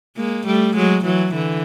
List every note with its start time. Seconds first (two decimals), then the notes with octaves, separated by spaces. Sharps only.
0.17 G#3 A#3
0.46 G3 A3
0.75 F#3 G#3
1.04 E3 F#3
1.33 D3 E3